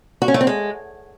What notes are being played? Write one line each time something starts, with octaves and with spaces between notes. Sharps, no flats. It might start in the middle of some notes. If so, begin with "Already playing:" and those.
F#4
C#4
A3
C4
G#3